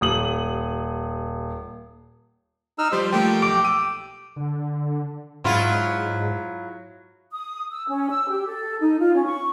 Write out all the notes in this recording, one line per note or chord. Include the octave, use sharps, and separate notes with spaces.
D#1 D#6 F#7
D#4 E6 F6
F3 G3 G4 C5
F3 A3 A#3 G4 G5
B1 D6
E6 D#7
D3
G#2 F#3 E4 F4
D#6
E6
C#4
E6
G4
A4
D#4
F4
C#4
C#6